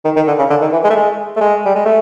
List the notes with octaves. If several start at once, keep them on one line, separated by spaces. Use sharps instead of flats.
D#3
D#3
D3
C#3
D3
D#3
E3
G#3
A3
G#3
A3
G#3
G3
G#3
A3